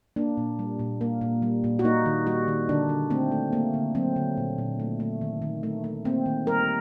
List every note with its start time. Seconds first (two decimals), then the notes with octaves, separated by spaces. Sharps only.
0.16 A#3 D4
0.37 A#2
0.59 G3
0.79 A#2
1.01 A#3
1.21 A#2
1.42 G3
1.64 A#2
1.79 F#4
1.84 A#3 D#4
2.06 D#3
2.27 G3 F#4
2.48 D#3
2.69 D3 D4
2.89 D3
3.10 A3 C4
3.32 A3
3.53 A3 A#3
3.74 D3
3.95 F#3 C4
4.16 D3
4.37 A#2
4.58 A#2
4.80 A3
5.00 A3
5.21 D#3
5.42 D#3
5.63 A3
5.84 A3
6.05 A#3 C4
6.26 D#3
6.47 G3 A#4